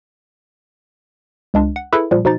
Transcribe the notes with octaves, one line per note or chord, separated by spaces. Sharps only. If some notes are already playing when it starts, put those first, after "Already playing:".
C#2 G#3 D4
F#5
E4 G#4 A4 B4 E5
A#2 F3 G3
B2 F3 D#4 A6